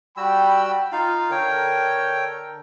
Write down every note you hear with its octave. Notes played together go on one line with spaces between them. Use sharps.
G3 F#4 G5 B5 E6
D#4 F4 F5
D3 A4 A#4 C#5 G5